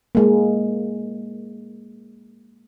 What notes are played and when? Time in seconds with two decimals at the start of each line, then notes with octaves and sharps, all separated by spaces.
0.15 G#3 A#3